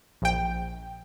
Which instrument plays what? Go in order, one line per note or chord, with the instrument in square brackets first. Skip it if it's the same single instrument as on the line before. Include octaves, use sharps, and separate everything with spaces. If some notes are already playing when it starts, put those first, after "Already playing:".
[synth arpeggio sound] A#1 G5